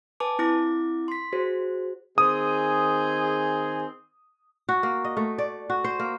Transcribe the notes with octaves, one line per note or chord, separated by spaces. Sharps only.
B4 G#5 A5 D6
C4 E4 D6 A#6
C6 B6
F#4 G#4 C5
D#3 C4 G#4 D#6
F#4
A#3
D#5
A3
D5
F#4
C5
A#3